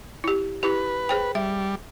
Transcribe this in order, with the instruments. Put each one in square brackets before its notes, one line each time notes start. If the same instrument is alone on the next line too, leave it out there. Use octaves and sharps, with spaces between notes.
[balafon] E4 G4
[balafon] E4 G4 [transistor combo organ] B4
[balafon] G#4 C5 G5
[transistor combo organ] G3 [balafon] E5